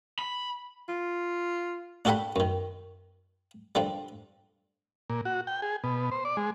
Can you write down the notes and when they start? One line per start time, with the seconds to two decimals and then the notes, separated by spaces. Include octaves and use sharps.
0.19 B5
0.89 F4
2.05 D4 F#4 G4 A4 F#5 B5
2.36 F#2 D#3
3.75 D3 F3 G3
5.10 A#2
5.25 F#4
5.47 G5
5.62 G#4
5.84 B2
6.11 C5
6.25 D5
6.37 G#3